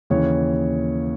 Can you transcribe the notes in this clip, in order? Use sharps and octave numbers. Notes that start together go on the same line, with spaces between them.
D#2 C#3 E3 C#5